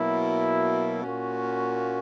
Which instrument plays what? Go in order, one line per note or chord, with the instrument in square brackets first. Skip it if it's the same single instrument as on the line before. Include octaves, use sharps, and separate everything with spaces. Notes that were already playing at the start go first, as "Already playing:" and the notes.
Already playing: [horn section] B2 F#3 A#3 E4
A#2 A#3 C#4 F#4